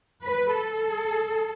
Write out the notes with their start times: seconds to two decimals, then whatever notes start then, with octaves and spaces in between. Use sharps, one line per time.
0.24 B4
0.53 A4